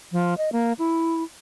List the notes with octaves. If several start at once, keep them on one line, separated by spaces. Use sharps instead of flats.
F3
D#5
A#3
E4